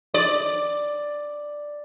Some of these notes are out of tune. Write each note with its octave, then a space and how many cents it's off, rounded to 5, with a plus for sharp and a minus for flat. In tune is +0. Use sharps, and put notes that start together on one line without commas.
D5 +5